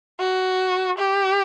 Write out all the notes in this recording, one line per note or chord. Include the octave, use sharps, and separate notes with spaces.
F#4
G4